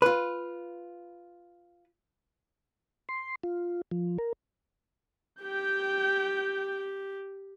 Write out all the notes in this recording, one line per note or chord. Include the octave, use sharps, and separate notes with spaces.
F4 B4
C6
F4
F3
A#4
G4 G5 G6